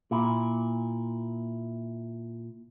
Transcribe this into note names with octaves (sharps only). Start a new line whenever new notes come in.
A#2 E4